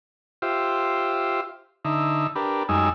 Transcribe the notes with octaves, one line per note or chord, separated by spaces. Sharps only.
F4 G4 C5 E5
D3 D#4 E5
D4 G4 A#4 B4
F#2 G3 G#3 D#4 G#5 E6